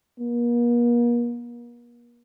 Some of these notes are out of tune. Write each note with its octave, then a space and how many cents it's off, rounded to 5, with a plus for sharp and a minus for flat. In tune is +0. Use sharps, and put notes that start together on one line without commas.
A#3 +40